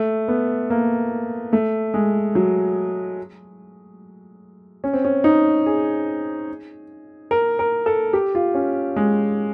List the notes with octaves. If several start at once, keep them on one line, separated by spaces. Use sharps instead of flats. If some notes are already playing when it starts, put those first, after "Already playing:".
Already playing: A3
B3
A#3
A3
G#3
F#3
C#4
C4
C#4
D#4
G#4
A#4
A#4
A4
G4
F4
C#4
G#3